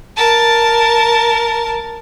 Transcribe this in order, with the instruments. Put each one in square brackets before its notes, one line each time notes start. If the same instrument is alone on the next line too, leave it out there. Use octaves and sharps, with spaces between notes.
[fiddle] A#4 A5